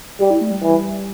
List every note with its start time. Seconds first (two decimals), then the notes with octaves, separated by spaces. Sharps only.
0.20 G3 G4
0.30 E4
0.41 A3
0.51 G3
0.62 E3